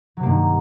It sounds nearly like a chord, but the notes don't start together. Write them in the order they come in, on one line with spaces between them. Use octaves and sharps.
F#3 C3 A#3 G2 D#3